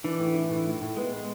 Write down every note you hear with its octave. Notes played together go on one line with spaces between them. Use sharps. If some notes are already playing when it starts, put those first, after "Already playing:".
E3 D4
A2
D4
A2
A2
A2
G#3 B3
B3